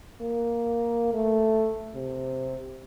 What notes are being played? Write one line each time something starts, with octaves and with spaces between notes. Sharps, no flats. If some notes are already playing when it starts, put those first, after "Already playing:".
A#3
A3
C3